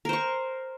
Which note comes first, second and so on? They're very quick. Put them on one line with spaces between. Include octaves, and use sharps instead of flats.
A#4 C5 C#6